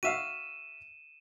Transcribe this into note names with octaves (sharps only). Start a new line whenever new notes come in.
F#4 E5 F5 D#7 E7